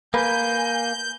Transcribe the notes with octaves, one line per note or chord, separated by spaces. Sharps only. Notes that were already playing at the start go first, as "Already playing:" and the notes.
A#3 B4 G#5 G6